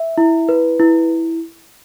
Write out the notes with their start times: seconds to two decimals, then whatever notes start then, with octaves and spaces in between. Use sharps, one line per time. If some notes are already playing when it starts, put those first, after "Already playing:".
Already playing: E5
0.18 E4
0.49 B4
0.80 E4